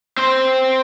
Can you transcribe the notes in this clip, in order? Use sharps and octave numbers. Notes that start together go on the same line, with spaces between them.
C4 C5